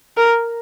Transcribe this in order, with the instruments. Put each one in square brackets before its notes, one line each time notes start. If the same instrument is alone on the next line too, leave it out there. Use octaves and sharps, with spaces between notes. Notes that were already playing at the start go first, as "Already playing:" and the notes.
[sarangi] A#4